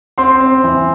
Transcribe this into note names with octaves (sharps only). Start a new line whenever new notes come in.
C4 C6
C4
E3